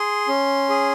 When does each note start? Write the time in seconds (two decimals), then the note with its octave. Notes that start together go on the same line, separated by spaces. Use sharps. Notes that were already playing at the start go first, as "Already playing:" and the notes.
Already playing: G#4 C6
0.28 C#4
0.69 G#4